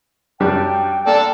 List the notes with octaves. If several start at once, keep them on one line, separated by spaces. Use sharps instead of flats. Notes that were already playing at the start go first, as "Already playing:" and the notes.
F#2 G3 D4 G5
A#3 A4 D5